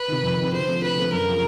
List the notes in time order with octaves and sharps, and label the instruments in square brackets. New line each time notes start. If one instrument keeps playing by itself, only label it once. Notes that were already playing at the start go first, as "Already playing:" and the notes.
Already playing: [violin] B4
[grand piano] C3 D#3
F2
D#3
C3
[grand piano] D3 [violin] C5
[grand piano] F3 A3 C4
[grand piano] D3 [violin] B4
[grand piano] F3 A3 C4
[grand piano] F#2 [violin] A#4
[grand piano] C#3 F3